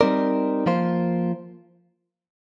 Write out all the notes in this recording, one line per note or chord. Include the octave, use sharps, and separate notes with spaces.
G3 C4 D#4 A#4 D5
F3 A#3 F4 C5